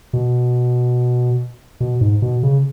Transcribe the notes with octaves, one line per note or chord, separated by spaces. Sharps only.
B2
B2
G#2
B2
C#3